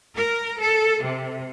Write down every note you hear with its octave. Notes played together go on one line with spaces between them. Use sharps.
A#4
A4
C3